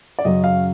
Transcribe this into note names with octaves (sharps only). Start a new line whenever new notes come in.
D5
F#2 C#3 F#3 D#5
F5